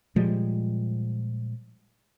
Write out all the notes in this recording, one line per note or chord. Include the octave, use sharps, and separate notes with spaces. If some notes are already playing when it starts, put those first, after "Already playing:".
A#2 F3 G3 G#3